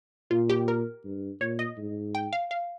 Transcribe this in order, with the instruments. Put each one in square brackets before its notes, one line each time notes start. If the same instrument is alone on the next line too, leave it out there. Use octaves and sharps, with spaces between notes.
[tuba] A#2 [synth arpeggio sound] F4
[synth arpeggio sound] G4
A#4
[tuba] G2
[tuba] A#2 [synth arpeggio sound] C#5
[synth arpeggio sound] D#5
[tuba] G#2
[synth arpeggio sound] G5
F5
F5